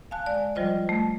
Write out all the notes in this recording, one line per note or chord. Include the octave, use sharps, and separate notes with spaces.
F5 G#5 A5 F#6
G#3 D5
F3 G3 F4 C5 D#5
A3